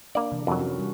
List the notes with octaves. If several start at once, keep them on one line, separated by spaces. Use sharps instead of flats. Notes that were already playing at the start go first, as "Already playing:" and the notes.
A#3 D4 D5
C3 E3
F2 F#3 A#4
C#4 F#4
G3